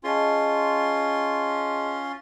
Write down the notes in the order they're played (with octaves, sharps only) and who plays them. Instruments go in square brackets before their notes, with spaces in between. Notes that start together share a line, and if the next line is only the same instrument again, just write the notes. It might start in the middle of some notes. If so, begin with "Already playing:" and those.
[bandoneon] C#4 F4 C6 [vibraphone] G#4 D#5 A5